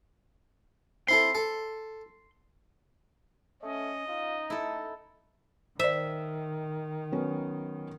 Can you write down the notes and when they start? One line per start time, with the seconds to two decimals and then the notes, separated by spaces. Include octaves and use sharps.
1.08 C4 E4 A4 C6
1.35 A4
3.63 A3 C#4 D#5
4.09 D#4 F4
4.50 A3 E4 A4
5.80 D#3 C5 D5 E5
7.12 F#3 B3 C#4